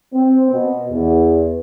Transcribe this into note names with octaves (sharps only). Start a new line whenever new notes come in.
C4
B2
E2